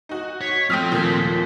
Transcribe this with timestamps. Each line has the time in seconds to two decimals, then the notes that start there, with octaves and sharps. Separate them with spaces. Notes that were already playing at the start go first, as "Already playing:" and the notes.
0.09 D#4 F#4
0.41 C#5 B6
0.70 F3 A3 C4 G5 D#6 F6 B6
0.92 D#2 A#2